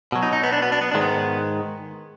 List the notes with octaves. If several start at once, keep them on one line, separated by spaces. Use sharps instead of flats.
B2 F#3
D#4
D#4
B3
D4
B3
D4
B3
G#2 D#3 G#3 D4
B3